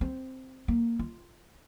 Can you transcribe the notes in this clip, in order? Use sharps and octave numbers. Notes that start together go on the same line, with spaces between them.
C4
A#3
F4